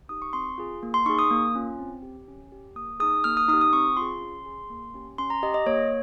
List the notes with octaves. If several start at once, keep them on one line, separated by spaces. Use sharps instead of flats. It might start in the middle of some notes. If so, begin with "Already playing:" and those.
D#4 G4 D#6
C#6
C4 C6
F4 G#4
A#3
C6
D#4 G#4 C#6
D#6
A#3
C#4 F4
C4
G4
C#4
G4
A#3 D#6
D#4 G#4 D#6
A#3 F6
D#6
D#4 D#6
G4
D#6
C4 C#6
F4 G#4 C6
C#4
G#4
A#3
C#4 G4
C#4 C6
A#5
G4 D#5
D#5
A#3 C#5